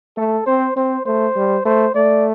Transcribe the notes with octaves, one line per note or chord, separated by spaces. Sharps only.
A3 A4
C4 C5
C4 C5
A3 C5
G3
A3 C5
A3 D5